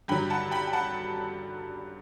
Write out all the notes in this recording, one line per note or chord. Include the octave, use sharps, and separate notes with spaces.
G2 D3 F#3 G5 B5
F#5 A5
G5 B5
G5
F#5 A5